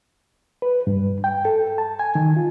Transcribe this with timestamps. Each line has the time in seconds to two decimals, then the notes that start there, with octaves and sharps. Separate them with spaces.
0.62 B4
0.87 G2
1.24 G5
1.45 A4
1.78 A5
1.99 G#5
2.15 D#3
2.37 F4